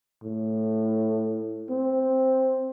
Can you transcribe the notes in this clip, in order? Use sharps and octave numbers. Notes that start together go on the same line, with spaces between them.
A2
C4